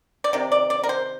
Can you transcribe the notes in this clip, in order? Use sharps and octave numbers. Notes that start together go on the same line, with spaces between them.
D5
C3 D#3
D5
D5
A#4
C5